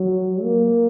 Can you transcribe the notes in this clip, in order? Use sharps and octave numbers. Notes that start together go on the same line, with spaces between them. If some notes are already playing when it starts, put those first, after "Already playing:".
Already playing: F#3
A#3